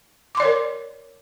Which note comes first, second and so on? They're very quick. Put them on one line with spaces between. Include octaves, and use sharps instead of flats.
D6 C6 D5 C#5 A#4